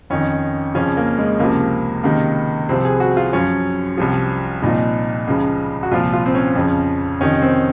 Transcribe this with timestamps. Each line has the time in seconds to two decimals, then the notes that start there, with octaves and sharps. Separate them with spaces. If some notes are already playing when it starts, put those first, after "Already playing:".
0.10 F2 D#3 C#4
0.75 F2 C#3 F3 C#4
0.97 A#3
1.18 G#3
1.39 C#2 C3 F3 A#3
2.03 C#2 C3 D#3 A#3
2.69 C2 C3 F3 C4
2.85 G#4
3.00 F#4
3.17 F4
3.33 F#2 F3 C#4
3.97 C2 C3 F3
4.62 C2 A#2 F3 D#4
5.27 C#2 C#3 F3
5.83 F#4
5.91 C2 A#2 F3 F4
6.13 F4
6.26 C4
6.35 C#4
6.55 F2 C#3 F3
7.20 F2 C3 D#3 C#4
7.42 C4